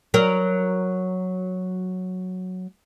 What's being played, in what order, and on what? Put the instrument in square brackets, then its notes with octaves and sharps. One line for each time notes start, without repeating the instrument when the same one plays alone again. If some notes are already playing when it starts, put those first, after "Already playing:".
[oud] F#3 A#4